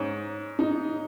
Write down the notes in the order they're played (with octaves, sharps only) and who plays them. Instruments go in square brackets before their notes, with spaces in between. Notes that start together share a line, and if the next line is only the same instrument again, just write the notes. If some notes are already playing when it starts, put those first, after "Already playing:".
Already playing: [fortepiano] G#2 [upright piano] C#4
[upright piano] D#4